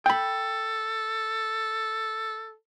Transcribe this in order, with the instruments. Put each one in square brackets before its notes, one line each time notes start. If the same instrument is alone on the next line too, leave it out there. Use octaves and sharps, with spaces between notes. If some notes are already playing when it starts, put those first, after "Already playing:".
[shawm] A4 [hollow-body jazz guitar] G5 B5